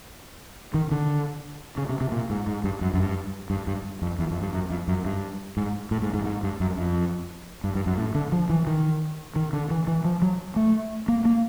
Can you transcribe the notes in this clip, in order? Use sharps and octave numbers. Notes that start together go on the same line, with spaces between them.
D#3
D3
C#3
C3
C3
A#2
G#2
G#2
G2
F#2
F#2
G2
G2
G2
F2
E2
F2
G2
F#2
F2
F#2
G2
G#2
A2
G#2
G#2
G#2
G2
F#2
F2
G2
G2
F#2
A2
D3
F3
E3
D#3
D#3
D3
E3
E3
F3
F#3
A3
A#3
A#3